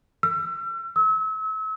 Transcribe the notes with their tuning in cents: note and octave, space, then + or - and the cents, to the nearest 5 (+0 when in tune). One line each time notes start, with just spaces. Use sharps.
E6 +45
E6 -35